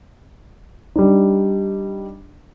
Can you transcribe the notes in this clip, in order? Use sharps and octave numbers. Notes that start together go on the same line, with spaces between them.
G3 D4 D#4